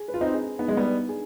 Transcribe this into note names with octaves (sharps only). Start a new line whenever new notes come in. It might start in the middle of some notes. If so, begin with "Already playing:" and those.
Already playing: G#4
B4
F4
C4 D#4
G#4
B3 D#4
G#3
G3 B3
B4
G#4